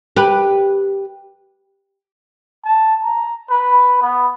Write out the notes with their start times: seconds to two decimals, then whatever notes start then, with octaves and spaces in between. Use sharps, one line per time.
0.16 G4 B4
2.65 A5
3.04 A#5
3.50 B4
4.02 B3